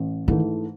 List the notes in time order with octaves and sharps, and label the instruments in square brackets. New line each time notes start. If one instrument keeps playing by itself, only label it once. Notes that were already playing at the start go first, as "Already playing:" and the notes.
Already playing: [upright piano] A1
[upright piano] G#2 E3 A3 [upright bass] D#3